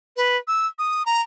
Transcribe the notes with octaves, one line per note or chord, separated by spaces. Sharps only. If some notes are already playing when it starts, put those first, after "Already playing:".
B4
E6
D#6
A#5